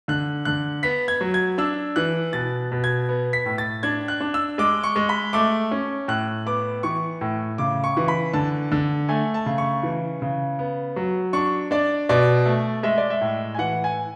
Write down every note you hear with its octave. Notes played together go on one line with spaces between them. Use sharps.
D3 F#6
D3 F#6
B3 B6
G#6
F#3
G#6
D4 E6
E3 F#6
B2 A6
B2
G#6
B3
B6
A2
A6
D4 G#6
F#6
D4
E6
G#3 D6
C#6
G#3
B5
A3 D6
C#4
A2 F#6
B3 D6
E3 C#6
A2
C#3 D6
C#6
E3
B5
D3 A5
D3
A3 G#5
A5
C#3
C#6
E3
C#3
B3
F#3
D4 C#6
D4 D5
B2 D5
A3
G#3 E5
D5
E5
A2
G#5
E3 F#5
G#5